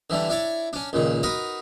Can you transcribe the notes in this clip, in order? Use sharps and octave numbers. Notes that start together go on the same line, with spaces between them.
D3 E3 G3 D4
D4 E4 C#5 D5
C#4 D4
C#2 A#2 D#3
D#4 F#4 A#4 B4